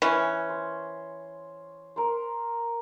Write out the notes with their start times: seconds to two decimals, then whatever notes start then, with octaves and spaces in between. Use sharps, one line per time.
0.02 E3 C#4
0.49 C5
1.96 A#4 C5